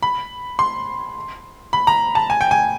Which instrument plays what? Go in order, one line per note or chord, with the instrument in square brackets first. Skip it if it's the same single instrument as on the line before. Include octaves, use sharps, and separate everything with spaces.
[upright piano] B5
C6
B5
A#5
A5
G#5
G5
G#5